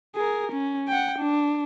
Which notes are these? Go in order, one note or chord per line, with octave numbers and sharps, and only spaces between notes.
G#4 A#4
C#4
F#5 G5
D4